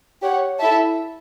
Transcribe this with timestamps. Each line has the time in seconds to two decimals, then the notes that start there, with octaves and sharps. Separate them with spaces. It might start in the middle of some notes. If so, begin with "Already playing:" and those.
0.22 G4 C#5 F#5
0.59 E4 A4 E5 A5